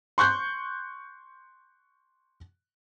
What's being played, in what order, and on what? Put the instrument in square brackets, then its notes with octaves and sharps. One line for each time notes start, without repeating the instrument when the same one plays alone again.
[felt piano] C6 C#6 F#6 G6